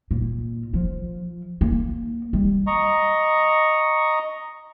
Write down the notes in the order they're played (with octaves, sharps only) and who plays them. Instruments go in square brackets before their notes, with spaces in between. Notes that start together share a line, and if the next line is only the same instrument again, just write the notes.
[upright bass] A#2
F3
A#3
G3
[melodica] D#5 A#5 C#6